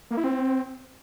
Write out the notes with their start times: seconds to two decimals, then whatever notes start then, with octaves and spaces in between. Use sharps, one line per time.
0.11 A#3
0.17 E4
0.24 C4